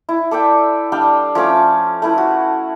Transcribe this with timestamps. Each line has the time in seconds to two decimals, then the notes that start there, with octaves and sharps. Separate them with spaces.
0.09 E4
0.31 A4 D5 E5 G5
0.92 G3 D4 F5 G5
1.35 F3 A3 C#4 D6
2.02 A3 E4 B4
2.18 F#4